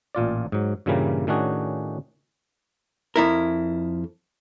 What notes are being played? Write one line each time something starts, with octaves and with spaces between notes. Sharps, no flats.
A1 A#2 F4 D5
G#2 F#3
G2 A#2 C#3 E3 G3 A#3
A2 D#3 C#4 D4 F#4 G#4
F2 E4 A#4